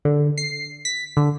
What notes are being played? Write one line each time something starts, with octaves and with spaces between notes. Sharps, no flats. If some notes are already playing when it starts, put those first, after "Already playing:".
D3
C7
B6
D3